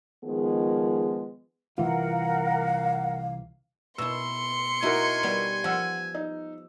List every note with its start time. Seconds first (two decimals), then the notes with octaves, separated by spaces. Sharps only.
0.24 D#3 F3 G#3 B3 G#4
1.78 C2 E3 F4 A#4 F5 F#5
3.98 B2 E4 C6 E6 C#7
4.83 D#4 E4 F#4 A#4 G#5
5.23 G3 B3
5.64 F3 F#5 E6
6.15 D#4